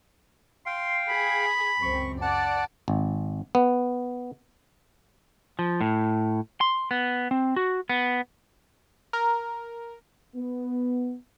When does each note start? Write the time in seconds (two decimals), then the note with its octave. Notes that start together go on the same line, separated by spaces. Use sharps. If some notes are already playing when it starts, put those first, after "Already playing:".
0.66 F5 G5 C6
1.09 G#4 B5
1.82 C#2 F#2 C4 C#6
2.21 D5 F#5 A5
2.88 G#1
3.55 B3
5.59 F3
5.81 A2
6.61 C6
6.91 B3
7.31 C4
7.56 F#4
7.89 B3
9.13 A#4
10.36 B3